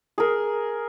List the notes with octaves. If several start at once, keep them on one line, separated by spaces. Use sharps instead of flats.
G#4 A#4